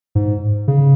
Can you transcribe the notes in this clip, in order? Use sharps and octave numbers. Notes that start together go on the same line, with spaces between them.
G#2
C#3